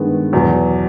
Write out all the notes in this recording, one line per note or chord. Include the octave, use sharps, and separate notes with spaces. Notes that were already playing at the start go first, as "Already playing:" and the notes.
Already playing: G2 D#3 G#3 B3
E2 B2 F#3